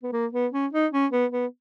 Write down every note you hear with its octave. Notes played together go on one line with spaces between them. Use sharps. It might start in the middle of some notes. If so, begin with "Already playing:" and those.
B3
A#3
B3
C#4
D#4
C#4
B3
B3